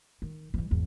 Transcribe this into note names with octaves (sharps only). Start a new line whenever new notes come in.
D#3
E3 G3
G#1 E2